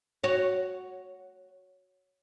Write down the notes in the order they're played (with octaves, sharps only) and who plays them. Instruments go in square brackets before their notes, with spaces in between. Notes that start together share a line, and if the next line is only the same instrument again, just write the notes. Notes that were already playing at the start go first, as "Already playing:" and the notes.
[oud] F#4 C#5